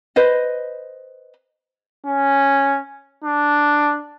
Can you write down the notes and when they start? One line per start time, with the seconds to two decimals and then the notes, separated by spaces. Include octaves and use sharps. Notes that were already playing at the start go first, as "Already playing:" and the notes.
0.16 B4 C5 D#5
2.06 C#4
3.24 D4